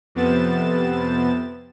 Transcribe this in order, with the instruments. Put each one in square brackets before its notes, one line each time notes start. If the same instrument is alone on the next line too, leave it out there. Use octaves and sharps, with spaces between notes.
[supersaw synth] F2 C3 B3 A6 E7